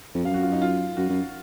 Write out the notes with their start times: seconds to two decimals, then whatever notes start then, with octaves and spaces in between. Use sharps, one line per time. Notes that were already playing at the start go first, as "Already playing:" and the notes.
0.14 F2
0.25 F#2 F5
0.34 F#4
0.43 F4
0.52 D#4
0.62 F4
0.97 F#2 F#4
1.09 F#2